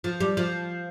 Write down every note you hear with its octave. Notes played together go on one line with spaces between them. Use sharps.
F3
G3
F3